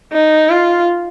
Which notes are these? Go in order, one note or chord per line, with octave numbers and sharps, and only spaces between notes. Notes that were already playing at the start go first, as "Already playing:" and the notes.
D#4
F4